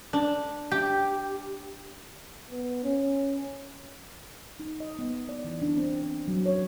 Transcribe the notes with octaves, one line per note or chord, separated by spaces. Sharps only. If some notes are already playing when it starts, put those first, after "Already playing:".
D4
G4
B3
C#4
D#4
D#5
B3
D5
E3
D4
C4
C4
F#3
C#5